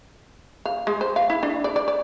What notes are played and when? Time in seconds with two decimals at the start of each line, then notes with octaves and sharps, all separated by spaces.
0.65 F5
0.87 G#3
1.01 C5
1.16 F5
1.30 E4
1.43 D4
1.64 D5
1.76 D5
1.88 D5